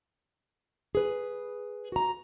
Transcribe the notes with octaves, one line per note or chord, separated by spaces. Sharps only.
G#4 B4
F#4 A#5